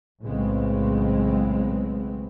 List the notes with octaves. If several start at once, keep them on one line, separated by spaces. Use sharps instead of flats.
B1 A2 C#3 G#3 B3 C4